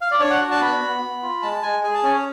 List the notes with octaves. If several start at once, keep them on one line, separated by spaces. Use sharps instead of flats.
F5
D5
D4 C#5
F#5
F#4
A5
B3 B5
B3
B3
F4
G#3 A5
G#3 G#5
G#4 G#5
A5
C#4 G#5
C#5